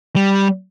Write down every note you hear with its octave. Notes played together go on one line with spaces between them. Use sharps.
G3